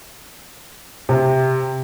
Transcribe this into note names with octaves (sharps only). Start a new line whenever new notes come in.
C3